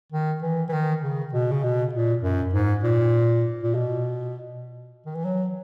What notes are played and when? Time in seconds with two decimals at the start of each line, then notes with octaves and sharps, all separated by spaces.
0.12 D#3
0.42 E3
0.69 E3
0.73 D#3
1.03 C#3
1.33 B2
1.51 C#3
1.64 B2
1.93 A#2
2.23 F#2
2.54 G#2
2.83 A#2
3.63 A#2
3.74 B2
5.06 D#3
5.15 E3
5.25 F#3